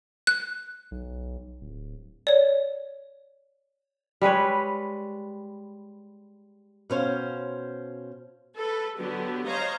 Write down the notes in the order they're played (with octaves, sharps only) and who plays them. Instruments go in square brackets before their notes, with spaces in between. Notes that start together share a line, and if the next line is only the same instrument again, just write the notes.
[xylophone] F#6
[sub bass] B1
D1
[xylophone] C#5 D5
[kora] G3 G#3 B4 C#5
[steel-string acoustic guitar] B2 C#4 C5 F5
[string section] A4 B4
D3 F#3 B3 G4
C5 C#5 D#5 F5 A#5